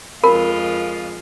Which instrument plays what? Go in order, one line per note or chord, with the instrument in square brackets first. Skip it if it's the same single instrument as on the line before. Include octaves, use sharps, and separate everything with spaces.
[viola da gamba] F2 G#3 F4 [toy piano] A#4 [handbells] B5